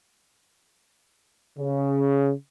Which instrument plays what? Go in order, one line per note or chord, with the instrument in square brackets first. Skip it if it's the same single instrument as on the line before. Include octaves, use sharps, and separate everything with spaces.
[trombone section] C#3